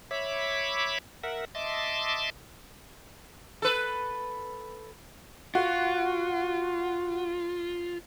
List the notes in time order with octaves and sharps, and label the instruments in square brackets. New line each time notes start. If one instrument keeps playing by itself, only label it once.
[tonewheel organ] C#5 E5 B5 D6
A#4 E5 F#5
D#5 E5 A5 C6 D6
[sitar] A4 B4
[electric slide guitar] F4 [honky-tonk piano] F#4